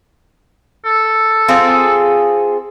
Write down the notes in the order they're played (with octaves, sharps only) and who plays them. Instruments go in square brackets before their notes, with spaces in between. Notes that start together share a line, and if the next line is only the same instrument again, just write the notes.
[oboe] A4
[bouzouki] C4 F4 G#4